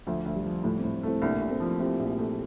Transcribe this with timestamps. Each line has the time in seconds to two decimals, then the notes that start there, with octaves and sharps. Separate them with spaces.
0.07 D2 F3
0.26 D2
0.35 G3
0.46 F3
0.64 A2 F3 A3
0.78 A3 C4
0.84 A2
1.03 A3 C4 E4
1.22 C2 A#3 D4
1.41 C2
1.50 A3 C4
1.60 F3
1.80 C4 E4 G4
1.99 A#1
2.18 A3